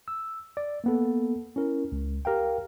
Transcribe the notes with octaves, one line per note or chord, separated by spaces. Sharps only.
E6
D5
A#3 B3 A4
C#4 E4 A#4
C#2
G4 A#4 F5 G5